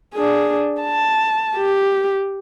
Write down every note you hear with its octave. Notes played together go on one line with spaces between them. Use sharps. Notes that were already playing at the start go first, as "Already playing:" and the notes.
D4 G#4
A5
G4